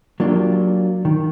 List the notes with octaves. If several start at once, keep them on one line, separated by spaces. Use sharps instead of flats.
F#3 A#3 D4 F4 G4
D#3